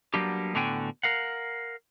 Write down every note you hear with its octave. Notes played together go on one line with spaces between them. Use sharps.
F#3 G3 A#3 B3 D4 G4
A2 D3 B3 F#4 G5 G#5
A#4 F5 F#5